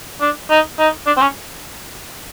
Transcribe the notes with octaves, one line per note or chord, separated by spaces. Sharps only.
D4
D#4
D#4
D4
C4
C#4